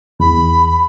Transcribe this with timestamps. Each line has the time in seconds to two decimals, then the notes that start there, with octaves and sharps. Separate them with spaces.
0.20 E2 B5